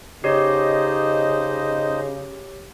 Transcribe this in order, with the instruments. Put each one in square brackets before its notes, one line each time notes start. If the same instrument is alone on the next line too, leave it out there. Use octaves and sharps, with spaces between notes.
[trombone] C#3 [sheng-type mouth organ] D#4 C5 D#5 [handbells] G4 C#5